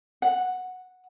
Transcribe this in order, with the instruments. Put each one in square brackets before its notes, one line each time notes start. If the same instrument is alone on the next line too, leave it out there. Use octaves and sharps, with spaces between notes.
[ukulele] F#5